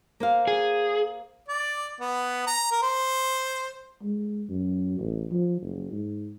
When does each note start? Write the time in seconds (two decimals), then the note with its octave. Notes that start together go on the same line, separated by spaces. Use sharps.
0.20 A#3 C5 F5
0.47 G#4
1.48 D5
2.01 B3
2.47 A#5
2.71 A#4
2.82 C5
4.03 G#3
4.49 F#2
4.99 A1
5.31 F3
5.62 F#1
5.92 G#2